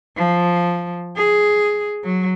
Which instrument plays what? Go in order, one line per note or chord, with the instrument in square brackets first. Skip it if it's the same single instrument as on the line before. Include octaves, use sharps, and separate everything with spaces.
[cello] F3
G#4
F#3